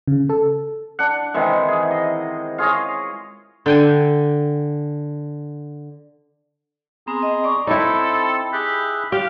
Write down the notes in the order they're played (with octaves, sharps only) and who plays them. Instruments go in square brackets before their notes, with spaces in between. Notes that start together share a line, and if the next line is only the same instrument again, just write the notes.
[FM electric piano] C#3
A4
[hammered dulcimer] D4 F#5
C3 D#3 E3 G#3
G#4
D#5
F4 G#4 C#5 D#5
[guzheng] D3 G5 G#5
[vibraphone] B3 C4 [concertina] G#4 A#5 C6
[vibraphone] D#5
D5 C#6 D6
[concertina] C4 [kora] D#4 E4 [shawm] A4 [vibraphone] B5
[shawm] G4 [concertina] G#4 E5 F#6
[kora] G4 [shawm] F5